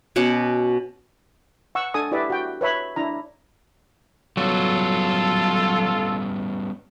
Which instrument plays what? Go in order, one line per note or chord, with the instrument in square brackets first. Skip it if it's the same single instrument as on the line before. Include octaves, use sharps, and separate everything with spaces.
[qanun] B2 C#4 F#5 D6
[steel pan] F#5 C#6 E6
D4 A4 G#5 D#6
E4 G4 B4 D5 E5
F#4 G5
B4 C#5 E5 B5
D4 E4 A#5
[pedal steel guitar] F#3 [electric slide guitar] G3 B3 C#4 [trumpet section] F4 A4